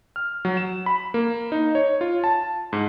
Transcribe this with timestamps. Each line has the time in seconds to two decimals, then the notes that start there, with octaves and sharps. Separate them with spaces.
0.16 F6
0.45 F#3
0.57 E7
0.86 B5
1.14 A#3
1.52 D#4
1.75 C#5
2.01 F4
2.24 A5
2.73 G#2